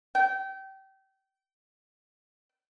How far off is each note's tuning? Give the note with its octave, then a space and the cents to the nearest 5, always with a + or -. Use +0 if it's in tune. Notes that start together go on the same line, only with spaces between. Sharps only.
G5 -25